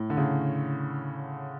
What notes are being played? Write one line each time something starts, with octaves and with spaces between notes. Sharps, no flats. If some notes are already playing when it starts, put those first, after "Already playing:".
Already playing: A2
D3
C#3